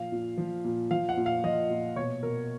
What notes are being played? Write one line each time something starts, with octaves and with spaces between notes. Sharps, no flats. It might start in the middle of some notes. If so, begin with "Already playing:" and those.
Already playing: A#2 F3 F5
A#2
F3
A#2
F3 F5
F#5
A#2
F5
F3 D#5
A#2
B2 C#5
B2 A#4